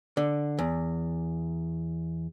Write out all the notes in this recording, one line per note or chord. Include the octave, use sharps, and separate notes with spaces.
D3
E2